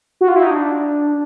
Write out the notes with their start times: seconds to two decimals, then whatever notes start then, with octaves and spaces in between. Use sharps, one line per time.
0.21 F#4
0.28 F4
0.36 E4
0.43 D#4
0.50 D4